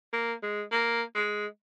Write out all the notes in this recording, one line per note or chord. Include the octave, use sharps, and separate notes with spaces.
A#3
G#3
A#3
G#3